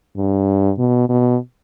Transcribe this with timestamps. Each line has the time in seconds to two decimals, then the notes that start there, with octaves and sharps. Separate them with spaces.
0.17 G2
0.78 B2
1.09 B2